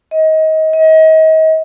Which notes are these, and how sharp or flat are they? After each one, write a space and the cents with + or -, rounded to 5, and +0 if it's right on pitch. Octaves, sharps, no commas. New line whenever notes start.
D#5 +25
D#5 +35